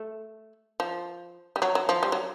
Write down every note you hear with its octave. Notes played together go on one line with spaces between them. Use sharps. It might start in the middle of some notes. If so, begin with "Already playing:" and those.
Already playing: A3
F3
G3
F#3
F#3
F3
G3
F#3